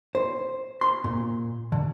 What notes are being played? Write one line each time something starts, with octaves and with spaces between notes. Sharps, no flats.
C5
C6
A#2
D3